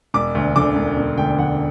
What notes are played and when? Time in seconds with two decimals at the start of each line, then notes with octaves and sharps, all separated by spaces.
0.14 E1 D6
0.35 D2
0.56 D3 D6
0.76 E1
0.97 E1
1.17 D2 G5
1.39 D3 F#5